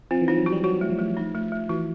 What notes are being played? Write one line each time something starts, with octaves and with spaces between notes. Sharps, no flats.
F3 C4
E3
F3 D#4
F#3
F#4
G3
F#3 F#4
A3
F3
A3
D#4
A3
A3
E3 F#4